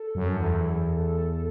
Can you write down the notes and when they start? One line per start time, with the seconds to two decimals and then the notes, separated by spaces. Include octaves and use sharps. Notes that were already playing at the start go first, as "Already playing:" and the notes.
Already playing: A4
0.15 F#2
0.37 E2